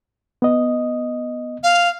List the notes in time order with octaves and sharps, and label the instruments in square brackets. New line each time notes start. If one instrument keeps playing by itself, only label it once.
[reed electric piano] B3 D#5
[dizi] F5